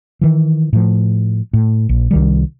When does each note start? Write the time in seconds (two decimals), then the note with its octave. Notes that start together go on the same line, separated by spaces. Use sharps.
0.21 D#3 E3
0.73 A2 F3
1.53 A2
1.89 A#1
2.11 C2 D#3 G3